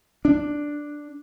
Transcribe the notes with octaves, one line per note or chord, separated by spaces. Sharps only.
D4